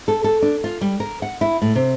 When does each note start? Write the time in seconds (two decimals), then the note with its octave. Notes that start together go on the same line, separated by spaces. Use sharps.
0.08 A4
0.24 A4
0.42 D4
0.64 F4
0.81 G3
1.00 A#4
1.22 F#5
1.41 E4
1.62 A2
1.75 C3